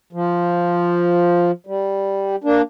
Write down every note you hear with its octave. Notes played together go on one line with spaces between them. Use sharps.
F3
G3
A#3 D4